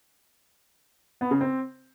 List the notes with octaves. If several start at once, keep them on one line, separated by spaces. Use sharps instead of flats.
B3
C#3
C4